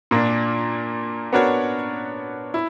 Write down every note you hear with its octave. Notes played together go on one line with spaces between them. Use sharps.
A#2 A#3 D4
B3 D4 F#4 A#4 C#5
E4